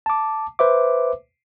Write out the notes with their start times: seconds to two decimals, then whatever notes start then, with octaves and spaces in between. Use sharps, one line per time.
0.06 A5 D6
0.59 B4 C5 E5 D6